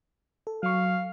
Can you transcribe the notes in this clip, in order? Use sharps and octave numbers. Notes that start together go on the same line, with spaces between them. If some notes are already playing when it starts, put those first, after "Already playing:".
A4
F#3 F5 C#6